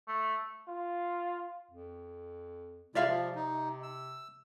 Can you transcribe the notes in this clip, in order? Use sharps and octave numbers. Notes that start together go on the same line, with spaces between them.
A3
F4
F2
C3 G#3 E4 F4 D5 E5 F5
F3
D#4
E6